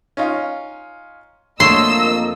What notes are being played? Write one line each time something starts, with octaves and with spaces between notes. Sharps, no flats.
C#4 D#4 F4
F2 D3 A3 A#3 C#5 D#5 C6 E6